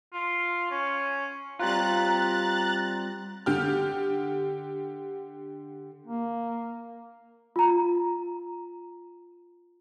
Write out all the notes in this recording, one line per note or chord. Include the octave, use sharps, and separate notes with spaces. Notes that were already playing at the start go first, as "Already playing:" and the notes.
F4
C#4
G3 C4 F4 A#5 F#6 A6
D3 G4 F6
A#3
F4 A#5